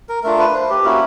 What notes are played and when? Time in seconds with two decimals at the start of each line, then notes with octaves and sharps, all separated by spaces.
0.09 A#4
0.24 A3 D4 F4 A#4
0.39 B4
0.54 C5
0.70 G4
0.84 A#3 C#4 E4 F#4